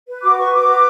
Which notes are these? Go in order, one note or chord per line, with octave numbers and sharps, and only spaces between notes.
B4
F#4 D6
B4 C#6
F#4 D6
B4